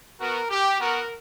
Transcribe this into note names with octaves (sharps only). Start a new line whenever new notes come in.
B3 F#4 A#4
G4
B3 F#4 A#4